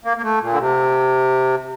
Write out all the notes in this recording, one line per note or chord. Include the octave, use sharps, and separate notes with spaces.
A#3
A#3
A3
A#2
D3
C3